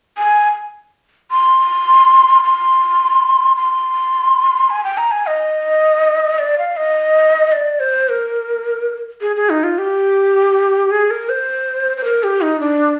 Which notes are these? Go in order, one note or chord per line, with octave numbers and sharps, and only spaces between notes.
G#5
C6
C6
C6
G#5
G5
A#5
G#5
D#5
D5
F5
D#5
D5
C5
A#4
G#4
G#4
D#4
F4
G4
G#4
A#4
C5
C5
A#4
G4
D#4
D4